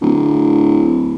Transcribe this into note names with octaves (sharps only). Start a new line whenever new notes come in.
D1